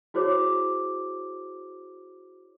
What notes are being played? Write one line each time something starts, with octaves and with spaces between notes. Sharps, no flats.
E4 F#4 G#4 C5 C#5 D6